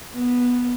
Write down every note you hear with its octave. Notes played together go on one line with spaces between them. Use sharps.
B3